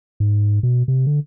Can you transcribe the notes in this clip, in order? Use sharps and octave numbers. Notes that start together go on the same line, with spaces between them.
G#2
B2
C3
D3